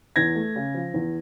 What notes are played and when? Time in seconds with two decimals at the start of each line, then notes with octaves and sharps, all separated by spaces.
0.16 E2 G#6 A#6
0.35 A3
0.56 C#3
0.74 F3
0.94 E2